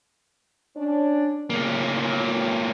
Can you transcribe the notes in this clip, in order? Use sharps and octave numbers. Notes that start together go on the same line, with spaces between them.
C#4 D4
A2 C#3 A#3